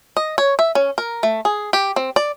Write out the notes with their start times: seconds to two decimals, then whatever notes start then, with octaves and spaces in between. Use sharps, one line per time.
0.17 D#5
0.38 C#5
0.59 E5
0.75 C#4
0.98 A#4
1.23 A3
1.45 G#4
1.73 G4
1.96 C4
2.16 D5